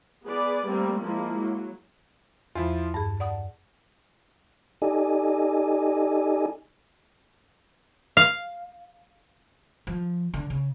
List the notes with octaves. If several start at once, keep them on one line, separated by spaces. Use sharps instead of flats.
B3 G#4 B4 D5
G3 A3 A#3 C4
F3 G#3 A#3 E4
F#3
E2 F3 E4 F4
G2 G#4 A5
D5 F#5 D#6
D#4 G4 A4 D5 D#5 G#5
F5
F3
D3
C#3